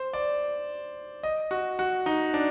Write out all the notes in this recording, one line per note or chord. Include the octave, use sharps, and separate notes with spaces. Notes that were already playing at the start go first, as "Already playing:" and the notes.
Already playing: C5
D5
D#5
F#4
F#4
D#4
D4